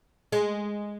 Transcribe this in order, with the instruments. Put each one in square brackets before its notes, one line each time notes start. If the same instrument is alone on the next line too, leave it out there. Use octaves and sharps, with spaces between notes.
[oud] G#3